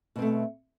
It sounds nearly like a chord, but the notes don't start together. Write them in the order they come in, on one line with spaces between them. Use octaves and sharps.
B2 C4 A3